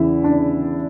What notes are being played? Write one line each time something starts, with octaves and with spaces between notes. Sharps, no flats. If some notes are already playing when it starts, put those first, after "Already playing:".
Already playing: E2 C#3 E3 E4
D4